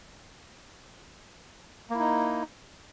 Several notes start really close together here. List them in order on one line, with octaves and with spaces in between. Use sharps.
A#3 E4 D#4